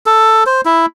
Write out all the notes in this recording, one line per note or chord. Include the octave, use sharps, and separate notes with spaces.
A4
C5
E4